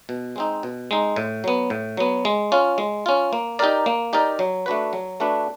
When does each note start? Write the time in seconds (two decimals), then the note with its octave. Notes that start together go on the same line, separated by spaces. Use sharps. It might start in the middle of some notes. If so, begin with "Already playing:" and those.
0.09 B2
0.36 G#3 C4 D#4
0.63 B2
0.91 G#3 C4 D#4
1.16 A2
1.44 F#3 B3
1.70 A2
1.97 F#3 B3
2.25 G#3
2.52 C#4 F4
2.78 G#3
3.06 C#4 F4
3.33 A#3
3.59 D#4 G4 A#4 D5
3.86 A#3
4.13 D#4 G4 A#4 D5
4.39 F#3
4.66 A3 D4 F#4 B4
4.93 F#3
5.20 A3 D4 F#4 B4